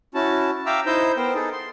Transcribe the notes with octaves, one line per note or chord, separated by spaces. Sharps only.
C#4 E4 F#4 A5
E5 F5 G5 A#5 D6 E6
D#4 E4 C5 D#5 E6 G6
B3 A#4 C5 G5
D#4 G#4 A4
C6